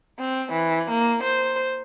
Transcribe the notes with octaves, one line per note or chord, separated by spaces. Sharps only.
C4
E3
A#3
C5